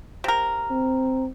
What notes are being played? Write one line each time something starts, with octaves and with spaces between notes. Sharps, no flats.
C3 A#4
C4